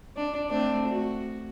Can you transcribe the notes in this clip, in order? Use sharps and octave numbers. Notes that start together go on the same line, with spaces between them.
D4
A3 C4 D4
F#4